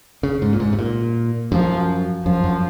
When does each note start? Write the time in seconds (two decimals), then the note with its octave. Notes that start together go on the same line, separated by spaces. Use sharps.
0.23 C#3
0.42 G#2
0.53 A#2
0.60 G#2
0.73 C3
0.79 A#2
1.52 F#2 F3
2.26 F#2 F3
2.44 F#2